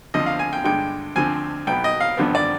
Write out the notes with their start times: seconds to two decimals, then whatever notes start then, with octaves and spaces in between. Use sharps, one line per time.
0.14 D2 D3 F3 C4 D#5
0.26 F5
0.39 G#5
0.53 G5
0.64 G2 D3 G#3 G5
1.16 D2 D3 F3 C4 G#5
1.67 B1 B2 B3 G5
1.84 D#5
2.00 F5
2.17 G#1 G2 D3 F3 B3
2.35 D5